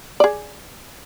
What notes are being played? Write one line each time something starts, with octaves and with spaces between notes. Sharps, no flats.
G#4 D5